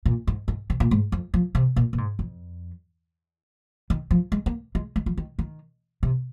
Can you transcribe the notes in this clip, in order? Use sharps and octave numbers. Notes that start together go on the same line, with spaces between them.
A#2
G#2
G#2
C3
A#2
G#2
F2
F3
C3
A#2
A#2
G#2
F2
D#3
F3
G#3
A#3
G#3
G#3
F3
D#3
D#3
C3